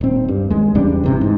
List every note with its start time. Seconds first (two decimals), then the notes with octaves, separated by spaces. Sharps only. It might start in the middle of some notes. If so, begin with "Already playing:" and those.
0.01 D#1 C4
0.28 G2
0.50 D#2 G#3
0.75 E2 C#3 G3 D4
1.04 G#1 C3 E3
1.21 G#2